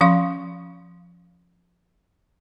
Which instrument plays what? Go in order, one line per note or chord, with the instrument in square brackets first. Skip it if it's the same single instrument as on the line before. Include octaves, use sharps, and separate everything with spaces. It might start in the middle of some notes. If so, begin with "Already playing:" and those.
[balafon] F3 C#4 F5 C6 C#6